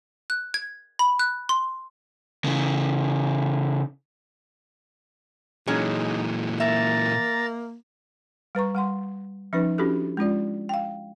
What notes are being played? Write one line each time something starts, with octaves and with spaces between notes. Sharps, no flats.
F#6
G#6
B5
F#6
C6
C#3 E3
A#2 E3 F#3 C#4 D#4 G#4
A#3 E5 A#5 A6
G3 B4 A#5 C#6
G3 F#5 C6
F3 C#4 D#4 B4
C#4 D4 E4 F#4 G4 A4
G#3 C#4 F4 D5
F5 G5